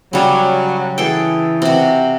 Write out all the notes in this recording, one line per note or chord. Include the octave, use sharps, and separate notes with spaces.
C#3 F#3 G3 C#5
E3 G#4 A4 G5
C3 F#4